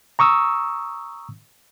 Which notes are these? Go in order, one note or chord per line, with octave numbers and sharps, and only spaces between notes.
A#5 C#6 D#6 E6